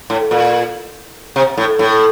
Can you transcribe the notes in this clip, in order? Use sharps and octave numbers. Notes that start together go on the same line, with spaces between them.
A2
A#2
C3
A2
A2